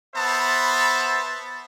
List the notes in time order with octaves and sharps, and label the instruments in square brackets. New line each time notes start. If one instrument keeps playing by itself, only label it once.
[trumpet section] B3 C5 E5 A5 B5